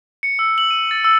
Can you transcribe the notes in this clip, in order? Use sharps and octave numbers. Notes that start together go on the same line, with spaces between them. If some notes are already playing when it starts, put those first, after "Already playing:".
C#7
E6
F#7
D#7
A6
E6